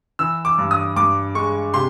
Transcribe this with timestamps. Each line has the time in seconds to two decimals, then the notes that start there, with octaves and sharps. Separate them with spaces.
0.19 E3 E6
0.45 D6
0.58 G2
0.71 D#6
0.96 G2 D6
1.35 G#3 C#6
1.74 C3 C6